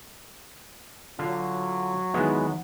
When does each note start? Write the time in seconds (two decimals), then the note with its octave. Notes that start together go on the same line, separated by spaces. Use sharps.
1.19 D3 F#3 F4
2.14 E2 D#3 E3 G#3 B3